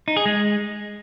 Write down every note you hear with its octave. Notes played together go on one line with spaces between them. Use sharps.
D#4
G#4
G#3